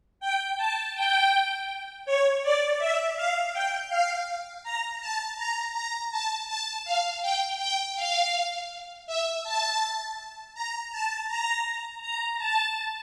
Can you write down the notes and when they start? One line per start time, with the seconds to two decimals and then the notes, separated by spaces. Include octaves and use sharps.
0.20 G5
0.57 A5
0.95 G5
2.05 C#5
2.42 D5
2.78 E5
3.16 F5
3.53 G5
3.89 F5
4.63 A#5
5.00 A5
5.37 A#5
5.74 A#5
6.11 A5
6.47 A5
6.84 F5
7.21 G5
7.59 G5
7.96 F5
9.06 E5
9.43 A5
10.54 A#5
10.91 A5
11.28 A#5
12.02 A#5
12.38 A5